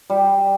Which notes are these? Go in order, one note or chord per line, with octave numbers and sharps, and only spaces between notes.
G3